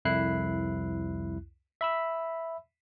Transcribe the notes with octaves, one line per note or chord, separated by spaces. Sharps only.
C2 F2 E4 F#6 C7
E5 B5 E6